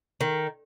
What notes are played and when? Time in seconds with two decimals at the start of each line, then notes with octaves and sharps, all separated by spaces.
0.21 D#3